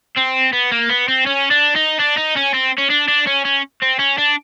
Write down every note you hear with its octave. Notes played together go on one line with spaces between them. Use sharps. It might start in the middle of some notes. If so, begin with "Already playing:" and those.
C4
B3
A#3
B3
C4
C#4
D4
D#4
D4
D#4
C#4
C4
C#4
D4
D4
C#4
C#4
C4
C#4
D4